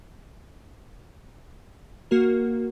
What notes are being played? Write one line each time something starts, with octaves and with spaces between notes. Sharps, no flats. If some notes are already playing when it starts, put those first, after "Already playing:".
A#3 F#4 A#4